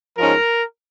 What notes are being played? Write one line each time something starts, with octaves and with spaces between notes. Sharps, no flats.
G#2 F3 G#3 C#4 A#4